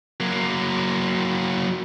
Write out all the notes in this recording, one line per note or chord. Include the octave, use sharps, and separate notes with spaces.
F#3 A#3